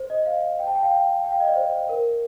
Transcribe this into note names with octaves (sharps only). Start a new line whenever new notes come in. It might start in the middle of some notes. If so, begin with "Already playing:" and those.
Already playing: C5
D#5
F5
G5
A5
G5
F5
G5
G5
F5
D#5
D5
C5
A#4